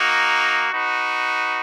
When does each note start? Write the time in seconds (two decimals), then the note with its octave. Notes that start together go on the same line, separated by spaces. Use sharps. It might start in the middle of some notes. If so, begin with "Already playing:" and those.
Already playing: A#3 D#4 F#4
0.72 D#4 F#4 B4